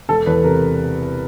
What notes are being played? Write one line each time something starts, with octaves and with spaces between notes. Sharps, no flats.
E1 A4
E2 B4
C3 A#4